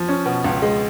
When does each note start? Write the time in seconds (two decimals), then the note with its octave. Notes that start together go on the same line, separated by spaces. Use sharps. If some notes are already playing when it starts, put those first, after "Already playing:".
Already playing: F3
0.09 C#4
0.26 B2
0.44 C#2
0.62 G#3